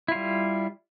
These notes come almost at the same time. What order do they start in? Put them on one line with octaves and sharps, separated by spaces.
E4 F4 G3